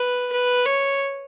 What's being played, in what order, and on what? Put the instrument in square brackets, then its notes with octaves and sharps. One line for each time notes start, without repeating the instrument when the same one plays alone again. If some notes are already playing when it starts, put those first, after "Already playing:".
Already playing: [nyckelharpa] B4
B4
C#5